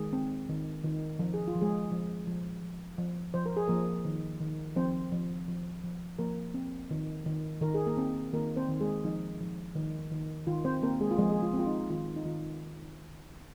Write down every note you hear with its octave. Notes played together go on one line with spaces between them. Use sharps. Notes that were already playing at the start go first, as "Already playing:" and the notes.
Already playing: D#3 G#3 G#4
C4
D#3
D#3
F3 A#4
G#4
F4
F3
G#3 G#4
F3
F3
F3
F3
F3 C5
A#4
G#4
F3 A#3 A#4
D#3
D#3
F3 C4 C5
F3
F3
F3
F3 A#3 A#4
C4
D#3
D#3
D#3 A#4
G#4
A#3 A#4
C4
D#3 A#3 A#4
C4 C5
D#3
G#3 G#4
F3 D#4
F3
D#3
D#3
D#3 F4
C4 C5
A#3 C4 A#4
G#3 G#4
F4
F3 G#3 G#4
G#4
F4
C4
F4
D#4
D#3 F4
D#4
D#3 F4